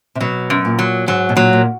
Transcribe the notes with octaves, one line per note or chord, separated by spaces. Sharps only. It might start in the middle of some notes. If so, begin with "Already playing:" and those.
C3
B2 F#3
F#2
A#2
F#3
G#2 F#3
B2
A#2 F#3
A#2